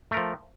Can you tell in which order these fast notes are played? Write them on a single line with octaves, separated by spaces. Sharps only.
A3 A#4 F3